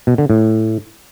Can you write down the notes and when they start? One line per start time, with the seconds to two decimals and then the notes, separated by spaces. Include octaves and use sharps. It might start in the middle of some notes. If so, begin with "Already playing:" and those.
0.07 B2
0.18 D3
0.30 A2